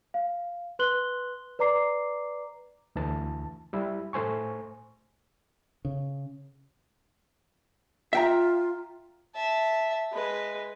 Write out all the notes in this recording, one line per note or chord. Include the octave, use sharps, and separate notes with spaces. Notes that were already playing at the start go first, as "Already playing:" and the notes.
F5
B4 C6 F#6 F#7 G7
B4 D5 A#5 D6 C7
D2 E3 A5
G3 E4
A2 A3 C5 G#5 C#6
C#3
F4 E5 G5 A#5
E5 A5
G#3 B4